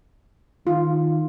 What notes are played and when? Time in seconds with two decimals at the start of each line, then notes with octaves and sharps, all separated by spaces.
0.67 D#3 F4